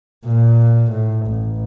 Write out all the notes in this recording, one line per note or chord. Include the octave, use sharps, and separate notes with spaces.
A#2
A2
A1